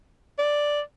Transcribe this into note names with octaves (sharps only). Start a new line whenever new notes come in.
D5